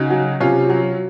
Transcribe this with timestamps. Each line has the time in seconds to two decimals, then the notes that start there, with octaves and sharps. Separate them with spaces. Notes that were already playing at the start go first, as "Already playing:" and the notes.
Already playing: C#3 D#4 F#4
0.10 F#3
0.40 C3 C#4 F4
0.70 F#3